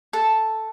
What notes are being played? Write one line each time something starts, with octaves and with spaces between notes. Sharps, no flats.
A4